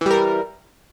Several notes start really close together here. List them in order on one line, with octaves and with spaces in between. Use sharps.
E3 G3 A#4